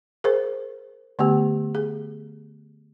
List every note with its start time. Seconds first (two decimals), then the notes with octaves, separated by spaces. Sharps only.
0.24 G#4 A#4 C5
1.19 D3 A3 B3 G4
1.75 G#4